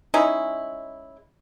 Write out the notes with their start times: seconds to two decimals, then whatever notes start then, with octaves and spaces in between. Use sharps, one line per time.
0.14 G#3 C#4 D#4 E4